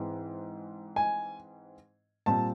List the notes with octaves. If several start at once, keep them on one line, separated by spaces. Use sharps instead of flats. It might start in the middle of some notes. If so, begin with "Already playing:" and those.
Already playing: G#2 E3 G#3 C4
G#5
A#2 G3 C4 A5